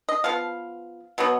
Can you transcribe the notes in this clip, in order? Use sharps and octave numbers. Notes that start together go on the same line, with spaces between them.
D#5
F3 B3 F5
B2 F#3 B3